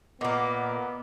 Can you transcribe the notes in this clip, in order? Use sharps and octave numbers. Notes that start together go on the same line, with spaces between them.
A#2 A#3 B3 D#5 F#5 D6